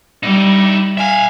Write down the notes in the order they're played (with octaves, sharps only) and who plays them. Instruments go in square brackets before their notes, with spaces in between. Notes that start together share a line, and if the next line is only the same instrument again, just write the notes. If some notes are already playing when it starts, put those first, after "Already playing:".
[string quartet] G3 [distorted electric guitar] D#4 E4
[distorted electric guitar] E5 F5 [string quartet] G#5